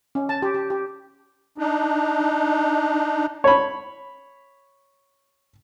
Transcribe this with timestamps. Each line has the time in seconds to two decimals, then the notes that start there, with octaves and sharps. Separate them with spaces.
0.15 C#4
0.29 A5
0.42 G4
0.55 G4
0.70 G4
1.58 D4 D#4
3.44 C#5 B5